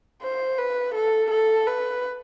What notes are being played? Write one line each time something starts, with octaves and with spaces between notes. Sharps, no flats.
C5
B4
A4
A4
B4